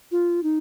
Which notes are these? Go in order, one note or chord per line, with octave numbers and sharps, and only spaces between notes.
F4
D#4